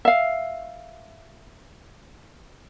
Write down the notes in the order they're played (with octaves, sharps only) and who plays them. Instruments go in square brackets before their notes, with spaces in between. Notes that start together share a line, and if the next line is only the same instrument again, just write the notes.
[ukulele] E5 F5